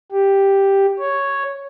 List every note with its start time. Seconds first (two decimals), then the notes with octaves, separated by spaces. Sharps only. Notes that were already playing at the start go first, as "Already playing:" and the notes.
0.12 G4
0.99 C#5